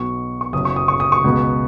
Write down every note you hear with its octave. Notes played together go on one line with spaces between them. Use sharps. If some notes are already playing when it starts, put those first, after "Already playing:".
Already playing: B1 B2 B3 C#6
C#6
F#1 F#2 F#3 B3 D#6
C#6
D#6
C#6
D#6
C#6
C#2 B2 G#3 B3